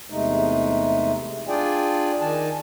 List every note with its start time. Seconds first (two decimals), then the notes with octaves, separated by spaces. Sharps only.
0.10 E2 C3 G#3 A3 D#4
1.48 D4 F4 G#4 D5 G5 G#5
2.21 D#3 G#5 A5